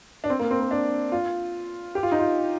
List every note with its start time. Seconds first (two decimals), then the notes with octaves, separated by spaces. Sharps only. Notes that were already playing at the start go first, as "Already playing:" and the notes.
0.24 D4
0.30 C4
0.39 A#3
0.51 C4
0.60 A#3
0.71 D4
1.12 F4
1.95 G4
2.03 F4
2.12 D#4
2.19 F4